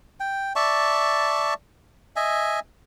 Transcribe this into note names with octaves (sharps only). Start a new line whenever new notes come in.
G5
D5 E5 A5 C#6
D#5 E5 G#5